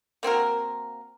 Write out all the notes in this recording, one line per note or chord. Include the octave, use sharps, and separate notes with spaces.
A#3 C4 F#4 A#4